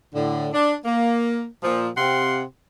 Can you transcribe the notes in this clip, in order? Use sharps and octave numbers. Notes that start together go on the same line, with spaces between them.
A2 D3
D4
A#3
A#2 F3
C3 C4 G4 F5 F#5 C6